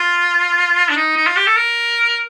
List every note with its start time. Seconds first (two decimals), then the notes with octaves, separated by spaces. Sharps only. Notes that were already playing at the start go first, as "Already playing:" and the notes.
Already playing: F4
0.89 D4
0.96 D#4
1.16 D#4
1.26 F4
1.37 G4
1.46 A4
1.56 A#4